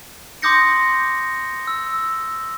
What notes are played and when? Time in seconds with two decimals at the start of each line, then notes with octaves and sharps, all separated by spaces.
0.42 C6 D6 D#6 G6 A#6 C#7
1.67 E6